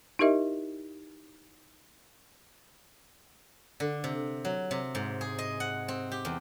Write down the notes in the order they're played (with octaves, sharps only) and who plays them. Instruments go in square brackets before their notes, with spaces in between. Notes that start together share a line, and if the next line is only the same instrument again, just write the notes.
[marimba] D#4 E4 G4 A#4 D#5 E5
[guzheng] D3
C3
F#3
C3
G#2
G#4
D#5
F#5
C4
G4
E2